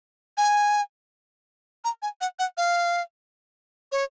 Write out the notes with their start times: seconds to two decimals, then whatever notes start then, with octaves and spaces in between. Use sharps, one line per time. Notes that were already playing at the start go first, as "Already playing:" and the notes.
0.37 G#5
1.84 A#5
2.02 G#5
2.21 F#5
2.39 F#5
2.57 F5
3.92 C#5